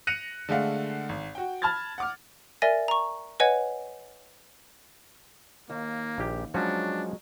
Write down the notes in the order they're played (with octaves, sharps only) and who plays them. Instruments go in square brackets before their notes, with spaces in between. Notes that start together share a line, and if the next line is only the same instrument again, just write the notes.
[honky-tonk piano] F#6 A#6 C#7 D#7 F7
D3 G#3 A3 F5 F#5
G#1
F#4 G5
A5 B5 F6 G#6 A6
F#5 D6 F6
[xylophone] A#4 D5 E5 G#5 A6 A#6
A#5 C#6
B4 C#5 D#5 F#5 G#5 G#6
[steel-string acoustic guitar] D#2 [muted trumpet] A#3
[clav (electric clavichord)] A#1 G4
[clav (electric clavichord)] F3 C#4 F#4 [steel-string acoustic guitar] F#3 G#3 [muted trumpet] D4